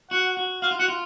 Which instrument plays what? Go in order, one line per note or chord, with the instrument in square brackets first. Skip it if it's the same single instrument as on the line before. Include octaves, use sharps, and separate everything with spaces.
[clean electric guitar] F#4 [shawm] F#5
[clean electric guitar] F#4
[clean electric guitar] F#4 [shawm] F5
[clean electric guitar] F4
[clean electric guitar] F#4 [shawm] F#5
[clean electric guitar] F4